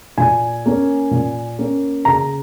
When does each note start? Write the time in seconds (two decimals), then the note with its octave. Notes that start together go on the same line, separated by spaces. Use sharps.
0.18 A#2 G#5
0.66 A#3 C#4
1.11 A#2
1.59 A#3 C#4
2.05 C#3 A#5